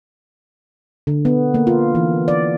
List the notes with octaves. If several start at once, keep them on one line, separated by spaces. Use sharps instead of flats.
D3
B3
A#3
F4
E3
D5